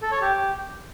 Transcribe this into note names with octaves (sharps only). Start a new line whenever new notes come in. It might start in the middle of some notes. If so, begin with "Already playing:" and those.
A4
C#5
G4